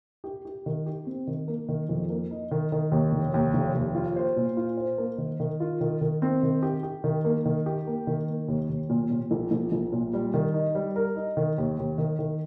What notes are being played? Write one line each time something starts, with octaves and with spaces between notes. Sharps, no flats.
G4
G4
D#3
G4
C4
D#3
A#3
D#3
F2
A#3
D#4
D#3
D#3
D#2
F1
D#2
F1
D#2
F4
C5
A#2
F4
C5
A#3
D#3
D#3
F4
D#3
D#3
C4
D#3
G4
G4
D#3
A#3
D#3
G4
A#3
D#3
A#3
D#2
D#2
A#2
A#2
A#1
A#1
A#1
A#2
G3
D#3
D#4
G3
A#4
D#4
D#3
D#2
D#2
D#3
D#3